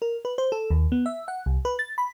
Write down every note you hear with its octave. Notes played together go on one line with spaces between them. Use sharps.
A#4
B4
C5
A4
D#2
B3
E5
F#5
C2
B4
A6
B5